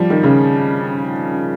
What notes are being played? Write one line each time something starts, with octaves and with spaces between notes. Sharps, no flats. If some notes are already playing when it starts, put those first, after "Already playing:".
Already playing: F3 G3
D#3
C#3